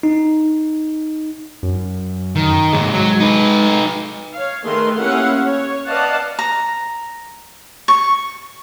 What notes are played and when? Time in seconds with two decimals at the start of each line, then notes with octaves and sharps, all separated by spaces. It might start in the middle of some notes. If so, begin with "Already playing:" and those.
0.03 D#4
1.63 F#2
2.36 D#3
2.73 D#2 G#2 G#3
2.92 F#3
3.20 D#4 B4
4.33 C#5 F5
4.63 D#3 A3 G#4 A#4 B4 C6
4.97 A#3 C#4 E4 G4 F5 F#5
5.45 C#5
5.86 B4 D5 D#5 F5 F#5 A5
6.39 A#5
7.88 C#6